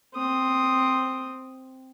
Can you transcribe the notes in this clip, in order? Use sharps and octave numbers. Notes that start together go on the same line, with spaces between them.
C4 D#6